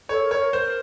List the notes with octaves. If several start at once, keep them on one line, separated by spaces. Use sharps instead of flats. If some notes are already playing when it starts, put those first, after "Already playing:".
A4 C#5
A#4
C#5
A#4
A#4 C5